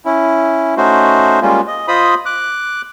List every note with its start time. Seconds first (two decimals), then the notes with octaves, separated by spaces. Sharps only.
0.05 C#4 E4
0.77 A3 C#4 D#4 F#4 C5
1.42 G3 G#3 A#3 C#4 F4
1.67 D#5
1.88 F4 C5 D#5 B5 D#6
2.26 D6 F#6